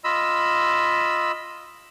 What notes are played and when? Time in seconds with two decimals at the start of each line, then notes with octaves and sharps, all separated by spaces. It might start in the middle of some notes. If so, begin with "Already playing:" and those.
0.04 F4 D#5 B5 E6